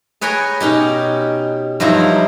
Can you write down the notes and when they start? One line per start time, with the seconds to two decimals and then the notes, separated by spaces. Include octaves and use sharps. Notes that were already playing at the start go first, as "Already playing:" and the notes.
0.21 G#4 B4 C#5 G5 G#5 A#5
0.60 B2 C#4 D#4 G4
1.80 G2 F3 F#3 D#4 E4